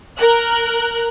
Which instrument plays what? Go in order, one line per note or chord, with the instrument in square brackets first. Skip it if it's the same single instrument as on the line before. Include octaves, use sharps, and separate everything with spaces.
[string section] A#4 F#6